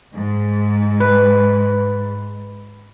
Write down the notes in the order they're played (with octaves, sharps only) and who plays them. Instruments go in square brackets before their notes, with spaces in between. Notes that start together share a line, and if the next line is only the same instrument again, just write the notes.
[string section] G#2
[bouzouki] B4